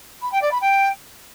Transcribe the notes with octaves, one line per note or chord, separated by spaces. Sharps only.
B5
G5
D5
B5
G5